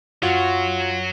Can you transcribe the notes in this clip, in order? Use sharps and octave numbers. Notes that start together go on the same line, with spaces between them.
F#2 F#3 F4 F#4